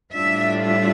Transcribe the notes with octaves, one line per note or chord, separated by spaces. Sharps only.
A2 G3 D4 F4 E5
E5